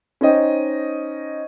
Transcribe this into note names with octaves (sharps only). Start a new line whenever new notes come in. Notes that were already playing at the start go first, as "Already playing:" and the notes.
C#4 D#4 C5 D#5 G5